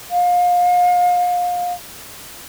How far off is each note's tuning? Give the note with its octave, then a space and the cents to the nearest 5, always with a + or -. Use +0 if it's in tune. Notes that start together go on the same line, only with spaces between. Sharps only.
F5 +30